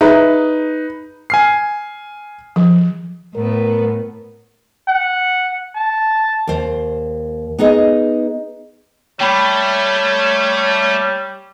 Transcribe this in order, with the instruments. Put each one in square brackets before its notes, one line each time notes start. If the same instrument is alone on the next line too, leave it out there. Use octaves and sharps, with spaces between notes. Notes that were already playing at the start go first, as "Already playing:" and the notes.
[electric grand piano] D#4 B4 [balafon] G#4 E5 A#5
[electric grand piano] G#5 F6 C7
[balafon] F3
[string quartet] A2 B3 [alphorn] A#4
[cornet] F#5
A5
[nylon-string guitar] D#2 C5
B3 D#4 G#4 D#5
[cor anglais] G3 [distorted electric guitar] A3 [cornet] C#5 [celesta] G5 B5